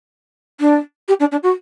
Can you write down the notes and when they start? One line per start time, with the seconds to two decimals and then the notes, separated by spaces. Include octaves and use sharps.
0.60 D4
1.08 G4
1.19 D4
1.31 D4
1.43 F#4